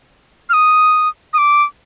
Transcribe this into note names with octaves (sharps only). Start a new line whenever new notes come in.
F6
D#6
D#6
D6